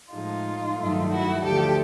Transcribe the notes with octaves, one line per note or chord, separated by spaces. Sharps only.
A2 F3 G#3 D#4 F4
G2 D#3 F#3 A3
E4 F#4
D2 D3 F3 A3 G4 A4